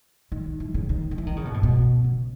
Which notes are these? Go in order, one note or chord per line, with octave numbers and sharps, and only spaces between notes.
D#3
E3
C#3
D#3
D#3
E3
D#3
C#3
B2
A2
B2
C#3